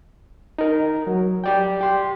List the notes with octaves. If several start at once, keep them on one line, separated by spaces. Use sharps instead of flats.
D#4 A#4
F#3
G4 D5 G5
G4 C6